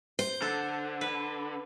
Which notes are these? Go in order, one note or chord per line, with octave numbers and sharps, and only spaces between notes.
C5
D3 A4
B4